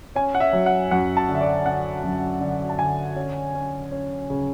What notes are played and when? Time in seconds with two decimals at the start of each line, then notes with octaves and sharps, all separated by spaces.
0.15 C#4 G#5
0.35 F#5
0.40 E5
0.53 F#3
0.66 F#5
0.91 F#2 F#5
1.17 A5
1.29 D3
1.35 E5
1.41 D5
1.66 D3 F#5
2.04 F#2
2.41 D3
2.70 A5
2.79 D3 G#5
3.16 C#4
3.55 C#4
3.92 C#4
4.30 C#3